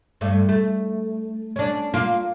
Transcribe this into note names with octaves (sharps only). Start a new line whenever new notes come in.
G2 A3
A3
C#4 D4
A#3 F4